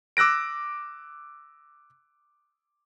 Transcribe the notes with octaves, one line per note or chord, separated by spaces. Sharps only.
D6 E6 F#6 A#6 D7